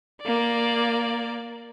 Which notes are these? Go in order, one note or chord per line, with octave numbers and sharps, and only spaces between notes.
A#3 D5